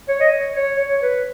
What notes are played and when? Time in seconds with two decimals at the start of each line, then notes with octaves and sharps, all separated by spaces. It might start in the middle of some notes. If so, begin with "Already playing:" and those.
0.09 C#5
0.20 D#5
0.32 C#5
0.55 C#5
0.79 C#5
1.02 B4